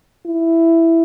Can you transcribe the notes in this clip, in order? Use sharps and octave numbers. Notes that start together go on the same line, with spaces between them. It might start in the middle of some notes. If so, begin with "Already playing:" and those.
E4